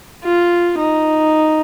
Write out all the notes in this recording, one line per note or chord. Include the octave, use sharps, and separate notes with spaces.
F4
D#4